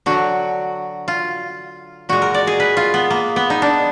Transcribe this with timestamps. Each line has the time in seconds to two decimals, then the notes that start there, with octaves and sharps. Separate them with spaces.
0.06 D3 F#3 F#4
1.08 F4
2.09 A#2 G#3 F#4
2.22 A#4
2.34 D5
2.47 G#4
2.60 B4
2.77 F4
2.94 B3
3.10 A#3
3.36 B3
3.50 D#4
3.62 D4